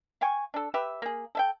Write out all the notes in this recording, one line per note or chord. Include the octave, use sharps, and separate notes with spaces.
F5 G5 G#5 C#6
D4 A4
G4 B4 E5
A#3 G#4
A4 E5 G5